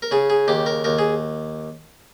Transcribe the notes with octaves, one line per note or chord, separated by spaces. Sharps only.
A#4
C#3 G#4
G#4
D#2 G4
A#4
D#2 A#4
G#4